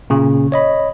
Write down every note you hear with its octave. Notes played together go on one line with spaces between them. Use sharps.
A#2 C#3
C#5 D#5 B5